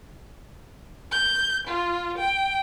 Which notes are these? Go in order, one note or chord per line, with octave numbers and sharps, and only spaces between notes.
G6
F4
G5